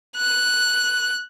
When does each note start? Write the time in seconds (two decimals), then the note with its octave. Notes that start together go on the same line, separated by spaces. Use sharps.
0.16 F#6